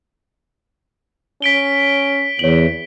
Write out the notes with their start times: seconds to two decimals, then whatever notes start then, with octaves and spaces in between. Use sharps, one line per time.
1.42 C#4 B6 D7 G7
2.39 E2 C#5 F#7